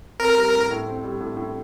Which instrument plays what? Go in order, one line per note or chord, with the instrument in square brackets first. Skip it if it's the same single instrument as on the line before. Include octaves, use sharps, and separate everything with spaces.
[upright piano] C4 [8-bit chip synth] A#4
[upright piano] G3
A2
A2
C4
G3
A2
A2